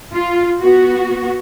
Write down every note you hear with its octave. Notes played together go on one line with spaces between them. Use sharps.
F4
B3 F#4